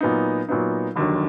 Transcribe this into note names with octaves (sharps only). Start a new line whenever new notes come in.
A#2 F#3 B3 D#4
A#2 F#3 B3 D#4
F1 D#2 D3 F#3